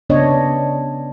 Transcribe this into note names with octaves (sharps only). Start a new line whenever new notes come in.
C#3 B3 D4 C#5 D#5